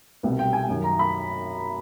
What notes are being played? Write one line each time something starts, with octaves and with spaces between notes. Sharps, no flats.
C2 B2 G3 B3
G5
G#5
F#2 D#3 F#3
A#5
B5